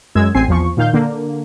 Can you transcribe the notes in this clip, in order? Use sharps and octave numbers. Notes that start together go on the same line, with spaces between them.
F#2 G#3 E6 G#6
A1 C4 G#5 C7
E2 F3 C#6
A#2 D#3 F5 G6
D3 A#3